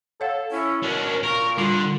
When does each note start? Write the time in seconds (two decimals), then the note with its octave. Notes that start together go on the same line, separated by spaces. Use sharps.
0.21 A4 C#5 F5 F#5
0.51 C#4 E4
0.83 B2 C#4 D4 A#4
1.23 A#2 A#4 C#6
1.58 D3 G3 F4 C6